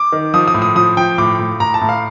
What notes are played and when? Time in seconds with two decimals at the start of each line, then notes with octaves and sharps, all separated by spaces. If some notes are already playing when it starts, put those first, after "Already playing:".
Already playing: D6
0.12 D#3
0.34 F3 D#6
0.48 D#6
0.54 A2
0.62 D#6
0.75 F3 D#6
0.97 F3 G5
1.18 A2 D6
1.39 A2
1.60 A2 A#5
1.74 A5
1.81 A2
1.89 F5